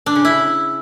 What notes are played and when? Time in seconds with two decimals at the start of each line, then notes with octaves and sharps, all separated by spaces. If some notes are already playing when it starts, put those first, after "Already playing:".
0.06 D4
0.16 C#3
0.25 E4